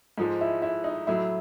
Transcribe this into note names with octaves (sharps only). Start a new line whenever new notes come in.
G#2 F3 G#3
E4
E4
D#4
A2 F#3 E4